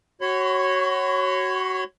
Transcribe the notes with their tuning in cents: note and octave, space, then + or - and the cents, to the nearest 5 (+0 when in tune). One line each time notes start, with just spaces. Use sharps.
F#4 +20 C#5 -10 B5 +45